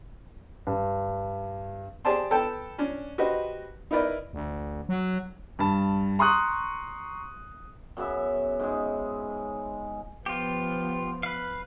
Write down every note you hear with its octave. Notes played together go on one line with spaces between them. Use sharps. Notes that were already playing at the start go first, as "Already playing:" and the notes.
G2
G4 G#4 C5 D5 A5 C6
B3 A4 G5 A5
C#4 D4
F#4 G4 B4 C5 D#5
D#4 E4 A#4 B4 D5 D#5
D2
F#3
G2 A5
A#5 C6 C#6 D#6 F#6
F#2 C#3 B3 E5
G#2 C#3 G#3
F3 B3 F4 G4
B4 F5